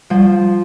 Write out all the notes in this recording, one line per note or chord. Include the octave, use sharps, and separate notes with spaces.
F3 G3